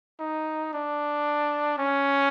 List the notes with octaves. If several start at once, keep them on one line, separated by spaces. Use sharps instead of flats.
D#4
D4
C#4